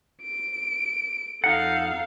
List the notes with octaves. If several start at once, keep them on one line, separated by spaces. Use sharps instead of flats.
D7
F2 D#4 A4 F5 F#5